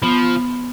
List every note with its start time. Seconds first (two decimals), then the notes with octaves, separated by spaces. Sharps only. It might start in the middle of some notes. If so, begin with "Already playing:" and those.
0.02 F3 B3